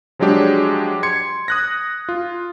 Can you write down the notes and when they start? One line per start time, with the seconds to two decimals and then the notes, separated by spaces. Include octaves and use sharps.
0.19 F3 F#3 G#3 D4 G4 C#5
1.03 C6 G#6 C#7
1.48 D#6 F#6 A#6
2.09 F4